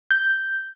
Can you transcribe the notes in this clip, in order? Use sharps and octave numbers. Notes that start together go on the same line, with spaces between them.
G6